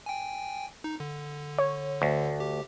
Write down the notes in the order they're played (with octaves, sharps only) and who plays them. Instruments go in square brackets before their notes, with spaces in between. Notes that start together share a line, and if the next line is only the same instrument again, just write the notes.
[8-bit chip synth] G5 G#5
D#4
D3
[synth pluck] C#5
[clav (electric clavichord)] D2
[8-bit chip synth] G4